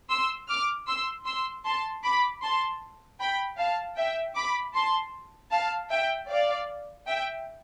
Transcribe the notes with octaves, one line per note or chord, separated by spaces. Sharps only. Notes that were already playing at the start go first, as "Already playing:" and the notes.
C6 E6
D6 F6
C6 E6
C6 E6
A5 C6
B5 D6
A5 C6
G5 B5
F5 A5
E5 G5
B5 D6
A5 C6
F5 A5
E5 G5
D5 F5
E5 G5